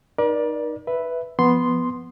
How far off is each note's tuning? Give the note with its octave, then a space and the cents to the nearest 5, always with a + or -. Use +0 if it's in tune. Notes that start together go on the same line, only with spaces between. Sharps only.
D#4 -15 A#4 +40 D5 +0
B4 +0 E5 +0
F3 -10 B3 +0 C6 +0